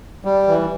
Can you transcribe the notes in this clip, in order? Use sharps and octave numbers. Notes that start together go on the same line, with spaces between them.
G3
E3